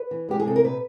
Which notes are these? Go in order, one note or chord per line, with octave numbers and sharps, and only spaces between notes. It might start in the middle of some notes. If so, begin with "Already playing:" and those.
Already playing: B4
E3
G#3 G4
G#4
C3 A4
A#4
A#2 B4